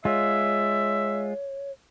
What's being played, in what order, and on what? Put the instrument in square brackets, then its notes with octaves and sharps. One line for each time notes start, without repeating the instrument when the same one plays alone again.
[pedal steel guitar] G#3 F4 [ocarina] C#5 [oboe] E5